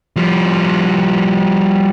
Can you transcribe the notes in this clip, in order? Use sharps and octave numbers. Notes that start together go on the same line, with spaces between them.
F3 G3